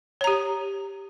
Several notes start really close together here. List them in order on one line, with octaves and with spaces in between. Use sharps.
C#5 A#5 G4